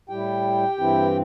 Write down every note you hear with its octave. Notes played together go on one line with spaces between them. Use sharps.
A2 G3 E4 G4 G5
G2 E3 C4 E4